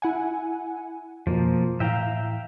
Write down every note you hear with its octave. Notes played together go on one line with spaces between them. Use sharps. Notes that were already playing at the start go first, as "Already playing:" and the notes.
E4 F#5 G#5
F2 B2 F3 A#3
A2 E3 E5 F5 G5 A#5